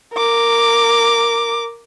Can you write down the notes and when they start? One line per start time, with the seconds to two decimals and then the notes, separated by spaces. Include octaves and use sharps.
0.14 A#4 D6